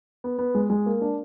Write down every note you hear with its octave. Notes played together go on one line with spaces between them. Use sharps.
B3
B3
G#3
G#3
A#3
D4